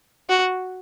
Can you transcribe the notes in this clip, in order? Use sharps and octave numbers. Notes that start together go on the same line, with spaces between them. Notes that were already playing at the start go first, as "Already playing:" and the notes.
F#4